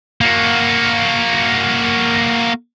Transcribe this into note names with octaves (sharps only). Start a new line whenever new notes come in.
A#3 F#4